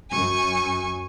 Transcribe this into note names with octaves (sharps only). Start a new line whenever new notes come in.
F#2 G#5 C#6